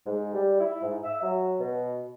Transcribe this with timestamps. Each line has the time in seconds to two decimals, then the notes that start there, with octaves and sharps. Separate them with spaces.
0.06 G#2
0.33 G3
0.61 E4
0.82 G#2
1.04 E5
1.22 F#3
1.59 B2